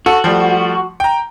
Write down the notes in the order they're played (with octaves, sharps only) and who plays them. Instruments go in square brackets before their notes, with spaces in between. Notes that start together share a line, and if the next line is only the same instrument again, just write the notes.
[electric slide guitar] F#4 [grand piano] A4
[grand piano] F3 G3 A3
G5 A#5